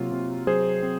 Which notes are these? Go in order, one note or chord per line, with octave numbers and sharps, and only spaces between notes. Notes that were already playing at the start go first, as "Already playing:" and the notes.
Already playing: C3 F#3 A#3 F4
C3
F#3 G#4 C5
C4